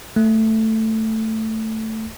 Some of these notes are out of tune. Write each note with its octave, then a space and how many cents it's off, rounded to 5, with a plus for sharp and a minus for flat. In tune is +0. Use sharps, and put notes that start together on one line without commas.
A3 +5